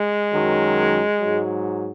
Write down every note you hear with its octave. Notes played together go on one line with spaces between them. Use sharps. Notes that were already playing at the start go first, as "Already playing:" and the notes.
Already playing: G#3
F#2 D#3 F#3
G#2 F#3